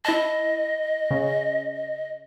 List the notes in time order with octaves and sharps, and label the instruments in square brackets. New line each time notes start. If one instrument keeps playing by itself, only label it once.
[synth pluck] E4 A5 [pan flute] D#5
[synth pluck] C#3